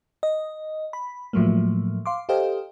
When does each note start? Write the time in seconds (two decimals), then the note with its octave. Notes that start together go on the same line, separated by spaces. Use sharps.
0.23 D#5
0.93 B5
1.33 A2 F3 F#3 A3 A#3
2.06 F5 C6 D6
2.29 G4 A4 C5 D#5 F5 G5